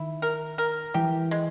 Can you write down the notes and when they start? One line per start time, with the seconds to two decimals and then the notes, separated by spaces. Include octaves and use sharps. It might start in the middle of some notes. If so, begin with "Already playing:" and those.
Already playing: D#3 E4
0.22 A#4
0.58 A#4
0.94 E3 G4
1.31 G#3